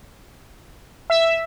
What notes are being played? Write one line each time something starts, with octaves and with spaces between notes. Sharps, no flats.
E5